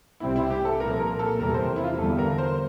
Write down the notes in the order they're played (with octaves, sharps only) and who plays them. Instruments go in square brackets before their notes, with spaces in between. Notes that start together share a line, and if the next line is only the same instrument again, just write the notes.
[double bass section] C2 C3 G3 C4 [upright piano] E4
[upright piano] E4
G4
A4
[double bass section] C2 A#2 F3 A#3 [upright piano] A#4
[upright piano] A#4
A4
[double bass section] E2 C3 E3 G3 [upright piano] A#4
[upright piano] C5
E4
F4
[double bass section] E2 D3 G3 [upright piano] A4
[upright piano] A#4
C5